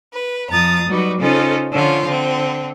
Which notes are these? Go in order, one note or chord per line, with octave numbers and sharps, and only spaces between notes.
B4
F2 F3 A#5 D#6 A6
F#3 G3 D#4 F#4 B4 D5
C#3 C#4 D#4 F4 A4 C5
D3 F3 C#4 F4
D3 C4